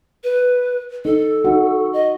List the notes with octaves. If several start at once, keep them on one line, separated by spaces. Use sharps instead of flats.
B4
D#4 A4
D#4 F#4
D#5